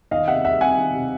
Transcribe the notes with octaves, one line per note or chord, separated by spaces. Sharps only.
D#3 D#5 F5
C3 E5 F#5
G3 E5 F#5
C4 F#5 G#5
D#3
C3